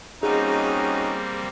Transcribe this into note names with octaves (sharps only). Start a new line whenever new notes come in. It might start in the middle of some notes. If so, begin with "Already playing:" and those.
G3 A#3 C4 C#4 D#4 F#4 G#4 D#5